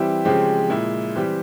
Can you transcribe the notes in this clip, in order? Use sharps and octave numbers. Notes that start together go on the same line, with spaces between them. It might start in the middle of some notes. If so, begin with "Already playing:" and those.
Already playing: E3 G3 C4 E4 G4
C#3 F3 G#3 C4 G4
A#2 G#3 E4
E3 G3 C4 G4